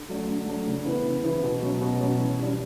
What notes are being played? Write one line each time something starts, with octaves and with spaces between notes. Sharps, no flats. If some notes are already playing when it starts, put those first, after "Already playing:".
Already playing: D3
F#3 A3 D4
D3
F#3 A3 D4
C#3
E3 B3 E4
C#3
E3 B3 E4
B2
F#3 C#4
B2
F#3 C#4
E3
G3 D4